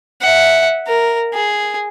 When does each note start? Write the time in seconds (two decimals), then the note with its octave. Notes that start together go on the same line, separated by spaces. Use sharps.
0.21 E5 F#5
0.88 A#4
1.34 G#4